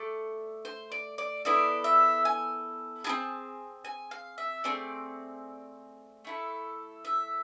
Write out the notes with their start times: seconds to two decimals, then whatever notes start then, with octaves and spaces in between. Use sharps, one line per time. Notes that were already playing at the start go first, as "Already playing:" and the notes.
Already playing: A3 A4 D5
0.65 C5
0.92 D5
1.18 D5
1.45 B3 E4 A4 D5
1.84 E5
2.25 G#5
3.04 E4 G#4 A5
3.09 C4
3.85 G#5
4.11 F5
4.38 E5
4.64 A3 C4 G#4 D5
6.25 A3 E4 A4
7.05 E5